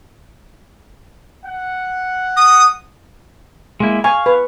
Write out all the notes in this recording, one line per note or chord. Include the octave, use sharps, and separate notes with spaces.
F#5
D#6
G#3 A#3 E4
F5 G#5 C#6
B4